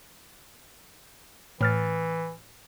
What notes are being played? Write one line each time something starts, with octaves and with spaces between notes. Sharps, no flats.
A2 E3 F6 A6